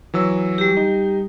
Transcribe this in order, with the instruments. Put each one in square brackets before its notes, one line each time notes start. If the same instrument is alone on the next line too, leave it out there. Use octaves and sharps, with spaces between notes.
[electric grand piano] E3 F#3 E6
[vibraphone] G3 G4
[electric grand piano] D#4